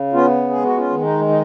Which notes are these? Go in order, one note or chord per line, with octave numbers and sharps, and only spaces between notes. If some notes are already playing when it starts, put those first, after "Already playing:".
Already playing: C#3
B3 C#4 F4
G#3 G#4
F#4
C#4 F4
D#3
D#4
D#4